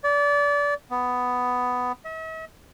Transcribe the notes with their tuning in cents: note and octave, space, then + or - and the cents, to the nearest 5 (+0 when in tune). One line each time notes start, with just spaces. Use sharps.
D5 -30
B3 +10
E5 -45